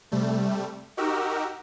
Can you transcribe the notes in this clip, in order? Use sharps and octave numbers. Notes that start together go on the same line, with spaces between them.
C3 G3 A3
D#4 F#4 G4 A#4 E6